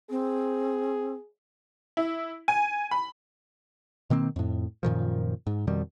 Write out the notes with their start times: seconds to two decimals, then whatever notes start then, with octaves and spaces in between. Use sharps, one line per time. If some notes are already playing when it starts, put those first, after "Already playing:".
0.10 C4 G#4
1.97 E4
2.48 G#5
2.91 B5
4.10 B2 D#3 A#3 C4
4.36 F2 A2
4.83 F#2 A#2 D#3 F3
5.47 G#2
5.67 F2 B2 D#3 G3